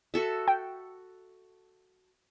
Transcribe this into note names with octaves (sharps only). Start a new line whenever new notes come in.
F#4 A4 E5
G5